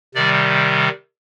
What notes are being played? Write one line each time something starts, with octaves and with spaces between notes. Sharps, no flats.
C3 D#3 G3 D5